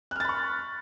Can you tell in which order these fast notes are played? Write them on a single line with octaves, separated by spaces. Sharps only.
F#6 F6 A6 B5 C#6